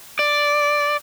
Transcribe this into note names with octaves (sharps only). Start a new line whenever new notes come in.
D5